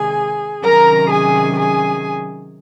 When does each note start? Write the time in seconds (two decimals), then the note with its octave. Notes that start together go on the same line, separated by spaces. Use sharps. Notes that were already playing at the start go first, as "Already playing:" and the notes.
Already playing: C3 D#3 G#3 G#4 G#5
0.64 C3 D#3 F#3 C#4 A#4 A#5
1.11 G#4 G#5
1.58 G#4 G#5